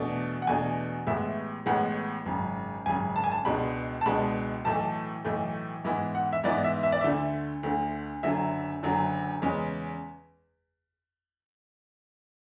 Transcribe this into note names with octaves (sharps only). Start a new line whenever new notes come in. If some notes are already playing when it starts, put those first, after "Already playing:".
Already playing: E2 B2 A3 D4
F#5
E2 B2 A3 D4 G#5
A1 A2 G#3 B3 E5
A1 A2 G#3 B3 F#5
G#1 F#2 C#3
G#1 F#2 C#3 G#5
A5
G#5
A5
C#2 B2 G#3 D4 B5
A5
C#2 B2 G#3 D4 B5
B1 A2 E3 A3 A5
B1 A2 E3 A3
G#2 E3 B3 E4
F#5
E5
G#2 E3 B3 E4 D5
E5
E5
D5
D2 D3 A3 E5
D2 D3 A3
F#1 F#2 D3 F#3 E5
F#1 F#2 D3 F#3
E2 C#3 G#3 C#4